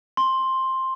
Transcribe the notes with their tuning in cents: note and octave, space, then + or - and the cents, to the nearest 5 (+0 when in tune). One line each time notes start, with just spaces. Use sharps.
C6 +10